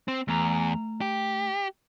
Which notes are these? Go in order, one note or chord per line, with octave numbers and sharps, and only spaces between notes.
C4
E2 A3 A#5
G4